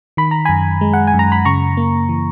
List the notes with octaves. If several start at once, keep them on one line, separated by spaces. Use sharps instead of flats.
D#3 B5
A#5
F#2 G#5 B5
G#3
F#5
G#5
F#2
A#5
B5
C#3 A#5 C#6
A#3
E3